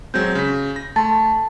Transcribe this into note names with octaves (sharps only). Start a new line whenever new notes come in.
F#3 G#3 C4 G6
C#3 B6
A#6
A3 A5 C6 A6